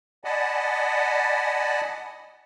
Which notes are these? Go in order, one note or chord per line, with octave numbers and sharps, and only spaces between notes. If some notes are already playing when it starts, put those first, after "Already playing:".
D5 D#5 F#5 G#5 A5 B5